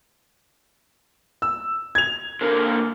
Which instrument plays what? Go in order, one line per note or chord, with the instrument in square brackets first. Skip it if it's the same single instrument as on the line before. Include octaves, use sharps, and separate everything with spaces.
[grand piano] E6
G#6 F7
[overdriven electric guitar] D3 A#3